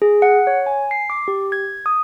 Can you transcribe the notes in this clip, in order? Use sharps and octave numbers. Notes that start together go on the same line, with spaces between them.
G#4
F#5
C#5
G#5
C7
D6
G4
G#6
D#6